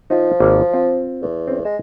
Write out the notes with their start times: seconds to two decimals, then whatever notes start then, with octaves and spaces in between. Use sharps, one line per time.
0.10 F3 D#4 F4
0.40 G#1 A#3
0.74 C4 F4
1.22 E2
1.48 C4 C#4
1.65 G#3 A5